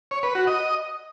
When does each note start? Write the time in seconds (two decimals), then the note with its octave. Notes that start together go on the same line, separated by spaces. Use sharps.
0.11 C#5
0.23 B4
0.35 F#4
0.47 D#5